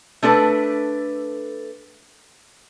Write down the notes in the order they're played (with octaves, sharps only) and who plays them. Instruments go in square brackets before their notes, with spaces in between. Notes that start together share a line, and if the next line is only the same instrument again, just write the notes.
[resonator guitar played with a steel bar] A3 D4 A4 B4